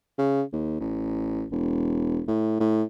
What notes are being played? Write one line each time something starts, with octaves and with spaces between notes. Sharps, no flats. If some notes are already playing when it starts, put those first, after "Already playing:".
C#3
D#2
A1
E1
A2
A2